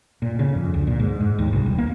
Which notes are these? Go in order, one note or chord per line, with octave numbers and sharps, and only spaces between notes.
A#2
C#3
F2
D2
A#2
G#2
G#2
D#2
C2
E1
A#3